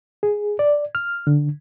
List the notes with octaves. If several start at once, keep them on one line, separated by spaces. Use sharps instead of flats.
G#4
D5
F6
D3